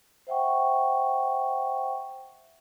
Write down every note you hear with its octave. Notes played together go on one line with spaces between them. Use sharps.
C5 E5 F#5 G5 C#6